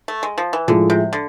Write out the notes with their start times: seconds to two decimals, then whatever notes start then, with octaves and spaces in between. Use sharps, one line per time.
0.08 A3
0.23 G#3
0.38 F3
0.53 E3
0.68 A2 D3 F3 G#3
0.90 C3
1.13 D3